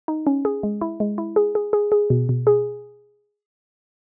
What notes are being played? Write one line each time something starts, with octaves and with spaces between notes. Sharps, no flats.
D#4
C#4
G#4
G#3
E4
G#3
E4
G#4
G#4
G#4
G#4
B2
B2
G#4